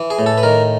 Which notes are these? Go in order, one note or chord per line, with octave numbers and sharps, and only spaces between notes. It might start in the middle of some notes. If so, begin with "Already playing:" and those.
Already playing: E3
G#4
A2
A4
B4
D#3 A#4